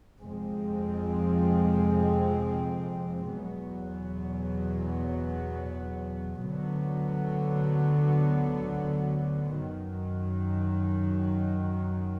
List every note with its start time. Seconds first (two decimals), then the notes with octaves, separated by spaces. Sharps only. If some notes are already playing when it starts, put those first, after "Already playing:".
0.19 F2 C3 F3 G#3 C4
3.33 E2 B2 F#3 B3
6.47 D2 D3 F#3 B3
9.60 F#2 D#3 F#3